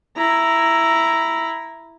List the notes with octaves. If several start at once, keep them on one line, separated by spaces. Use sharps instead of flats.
E4 A#5